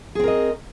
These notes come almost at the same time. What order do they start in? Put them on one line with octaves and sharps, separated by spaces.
G#4 C4 A#4 D#5